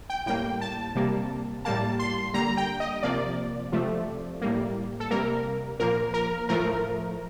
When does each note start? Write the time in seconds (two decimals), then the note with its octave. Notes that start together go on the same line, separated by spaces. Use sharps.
0.10 G5
0.26 A2 G3 A#3 G5
0.61 A5
0.95 C3 G3 A#3
1.65 A2 G3 A#3 A5
1.99 C6
2.34 D3 G3 A#3 A#5
2.57 G5
2.80 D#5
3.03 C3 F3 A#3 D5
3.72 C3 F3 A3
4.41 A2 G3 A#3
5.00 A4
5.10 C3 G3 A#3 A#4
5.80 A#2 F3 A#3 A#4
6.14 A#4
6.49 A2 F3 A3 A#4